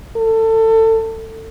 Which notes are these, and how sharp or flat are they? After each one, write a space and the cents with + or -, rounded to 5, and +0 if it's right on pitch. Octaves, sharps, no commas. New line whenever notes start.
A4 +25